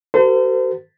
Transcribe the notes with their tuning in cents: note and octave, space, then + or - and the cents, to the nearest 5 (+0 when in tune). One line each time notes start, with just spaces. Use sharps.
F#4 +35 A4 +45 C5 -35